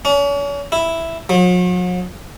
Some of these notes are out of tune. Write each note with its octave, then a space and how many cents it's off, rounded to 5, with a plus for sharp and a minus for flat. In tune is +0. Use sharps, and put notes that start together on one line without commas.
C#4 +40
E4 +0
F#3 -45